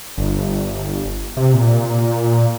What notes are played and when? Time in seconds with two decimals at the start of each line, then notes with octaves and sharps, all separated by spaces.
0.18 G1
1.37 C3
1.54 A#2